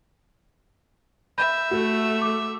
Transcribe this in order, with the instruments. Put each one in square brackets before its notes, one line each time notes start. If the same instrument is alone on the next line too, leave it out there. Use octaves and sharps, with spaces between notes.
[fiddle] E5 [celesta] B5 G6
[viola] A3 [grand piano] F#4 A4
[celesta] D6